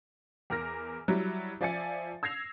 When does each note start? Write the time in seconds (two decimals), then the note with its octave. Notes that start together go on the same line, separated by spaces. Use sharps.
0.50 E2 A#4 F6 A#6
1.08 F#3 G3 E4
1.61 F3 D5 E5 G#5 A6 C#7
2.23 E6 G#6 A#6 C7 F7